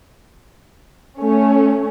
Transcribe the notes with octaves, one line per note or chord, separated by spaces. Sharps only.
A3 C#4